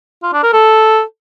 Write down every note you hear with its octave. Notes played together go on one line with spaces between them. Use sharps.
F4
D4
A#4
A4